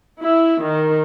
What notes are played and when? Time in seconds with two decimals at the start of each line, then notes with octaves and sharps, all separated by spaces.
0.20 E4
0.61 D#3